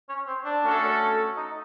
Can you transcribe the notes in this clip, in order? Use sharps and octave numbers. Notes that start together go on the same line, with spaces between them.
C#4
C4
D4
A3 C#4 F#4 A4
D#4